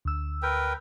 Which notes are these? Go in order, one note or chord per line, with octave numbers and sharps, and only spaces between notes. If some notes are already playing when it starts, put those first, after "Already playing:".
D2 E6
A#4 B4 G5